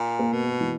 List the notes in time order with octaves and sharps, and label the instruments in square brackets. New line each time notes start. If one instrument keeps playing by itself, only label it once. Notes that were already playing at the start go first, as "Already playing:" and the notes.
Already playing: [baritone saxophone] A#2
[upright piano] A#3
[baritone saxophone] B2
[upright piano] A#3
E3